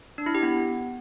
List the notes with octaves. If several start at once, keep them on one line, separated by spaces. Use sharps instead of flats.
D4
E4
G4
B3